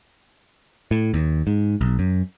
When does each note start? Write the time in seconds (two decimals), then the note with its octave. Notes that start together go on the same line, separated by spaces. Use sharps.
0.91 A2
1.14 D#2
1.47 G#2
1.81 B1
1.99 F#2